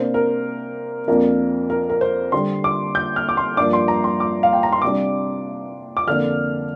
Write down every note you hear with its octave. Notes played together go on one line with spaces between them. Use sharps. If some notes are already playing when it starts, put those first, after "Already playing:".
Already playing: C3 A#3 D4 C5
A#4
F2 F3 A#3 D4 A#4
A#4
A#4
C5
D3 G3 D4 C6
D6
G6
F6
D6
C6
G2 F3 A#3 D4 D6
C6
A#5
C6
D6
F5
G5
A#5
C6
C3 G3 D4 D6
D6
F2 D3 A#3 D4 F6